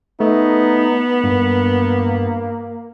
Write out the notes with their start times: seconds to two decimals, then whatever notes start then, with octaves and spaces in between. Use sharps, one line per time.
0.20 A3 B3 D#4
1.24 G2 A#3